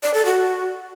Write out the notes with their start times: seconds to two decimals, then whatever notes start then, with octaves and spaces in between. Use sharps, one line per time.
0.03 D5
0.14 A4
0.25 F#4